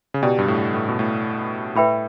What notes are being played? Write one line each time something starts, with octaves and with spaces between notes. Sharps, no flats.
C#3
B2 E4 G4 D5 G5
G2
A2
A2
B2
A2
A2 B4 E5 G5 B5